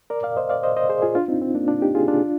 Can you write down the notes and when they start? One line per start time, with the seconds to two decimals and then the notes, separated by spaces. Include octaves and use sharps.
0.10 A#4 D5
0.23 D5 F5
0.37 C5 D#5
0.50 D5 F5
0.63 C5 D#5
0.77 C5 D#5
0.89 G#4 C5
1.02 F4 G#4
1.15 D4 F4
1.28 C4 D#4
1.42 C4
1.55 A#3 D4
1.68 D4 F4
1.82 D#4 G4
1.95 F4 G#4
2.08 D4 F4